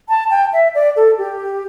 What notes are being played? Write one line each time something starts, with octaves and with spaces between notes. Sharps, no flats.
A5
G5
E5
D5
A4
G4